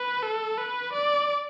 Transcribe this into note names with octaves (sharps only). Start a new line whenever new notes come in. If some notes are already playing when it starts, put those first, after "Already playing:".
Already playing: B4
A4
B4
D5